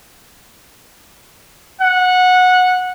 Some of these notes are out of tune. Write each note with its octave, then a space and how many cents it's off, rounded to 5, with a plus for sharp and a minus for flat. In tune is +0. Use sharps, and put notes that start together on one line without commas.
F#5 -15